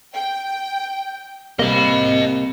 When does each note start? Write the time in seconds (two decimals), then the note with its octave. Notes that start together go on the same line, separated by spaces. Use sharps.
0.14 G5
1.59 C2 C3 A#3 D#5 B5